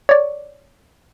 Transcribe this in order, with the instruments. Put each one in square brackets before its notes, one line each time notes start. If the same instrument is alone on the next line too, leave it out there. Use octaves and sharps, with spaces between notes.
[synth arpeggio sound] C#5 D5